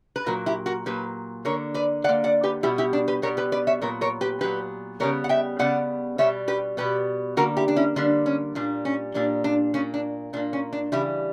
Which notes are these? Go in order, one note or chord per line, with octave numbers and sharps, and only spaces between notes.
B4
A#2 F#3 A#3 F#4 A#4
E4 G4
F#4 A#4
A#2 F#3 A#3 G4 B4
D3 A#3 A#4 C#5
B4 D5
D3 A#3 D5 F#5
D5 F#5
G4 B4
B2 G3 B3 E4 G4
E4 G4
D4
G4 B4
B2 G3 B3 A#4 C#5
G4 B4
B4 D5
C#5 E5
A#2 F#3 B3 A#4 C#5
A#4 C#5
G4 B4
A#2 F#3 B3 G4 B4
C#3 G3 B3 A#4 C#5
F#5
E5 G5
C#3 G3 B3 D5 F#5
B2 G3 B3 C#5 E5
G4 B4
B2 G3 B3 G4 B4
D3 G3 A#3 F#4 A#4
E4 G4
D4
C#4 E4
D3 G3 A#3 D4
C#4
A#2 G3 A#3 D4
C#4
A#2 G3 A#3 D4
D4
A#2 A#3 C#4
D4
A#2 A#3 D4
C#4
D4
C#3 E3 G3 E4 G4